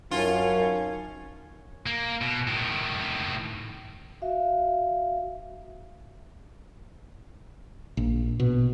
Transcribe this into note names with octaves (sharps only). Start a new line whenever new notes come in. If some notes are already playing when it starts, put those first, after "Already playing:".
F#2 C#4 D#4 F4 A#4 A5
A#3
B2
A2 D#3
F#4 E5 F5
A#1
B2